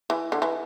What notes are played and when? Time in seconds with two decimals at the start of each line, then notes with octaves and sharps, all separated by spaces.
0.10 E3
0.32 D3
0.42 E3